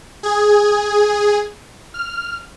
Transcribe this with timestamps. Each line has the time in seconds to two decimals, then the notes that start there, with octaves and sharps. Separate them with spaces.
0.23 G#4 G#6
1.94 F6